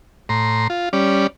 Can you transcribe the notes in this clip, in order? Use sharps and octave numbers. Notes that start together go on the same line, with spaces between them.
A2 A#5 C6
F4
G3 C#4 D5